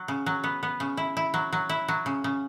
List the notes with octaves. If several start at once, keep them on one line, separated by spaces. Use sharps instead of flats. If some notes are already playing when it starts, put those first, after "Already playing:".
Already playing: F#3
C#3
F#3
B3
B3
C#3
E4
E4
F#3
F#3
E4
F#3
C#3
C#3